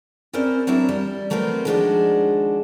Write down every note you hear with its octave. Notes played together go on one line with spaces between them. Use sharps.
C4 C#4 E4 A#4 C5 D5
F#3 C4 D4 E4 A#4
G3
F#3 A3 B3 C4 A#4 C5
D#3 F3 G#3 D4 F#4 C5